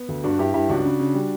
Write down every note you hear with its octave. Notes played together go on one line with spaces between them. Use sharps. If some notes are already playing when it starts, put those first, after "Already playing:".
Already playing: B3
D2
G2 D4 F#4
G2 E4 G4
G2 E4 G4
C#2 D4 F#4
C#3
C#3
G3